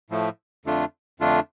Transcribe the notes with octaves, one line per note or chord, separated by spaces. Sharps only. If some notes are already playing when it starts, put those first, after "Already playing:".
A2 F3 A3
F2 D3 A3 D4 F4
F2 D3 A3 D4 F4